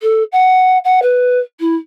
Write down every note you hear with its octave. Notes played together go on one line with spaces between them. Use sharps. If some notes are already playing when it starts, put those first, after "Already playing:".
A4
F#5
F#5
B4
E4